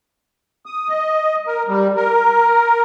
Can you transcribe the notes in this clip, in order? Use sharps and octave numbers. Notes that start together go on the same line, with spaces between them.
D#6
D#5
A#4
G3
A#4